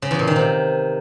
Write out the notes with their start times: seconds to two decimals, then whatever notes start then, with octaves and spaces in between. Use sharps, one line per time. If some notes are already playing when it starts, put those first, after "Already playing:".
0.02 C#3
0.11 E2
0.19 A#2
0.27 D#3
0.36 C3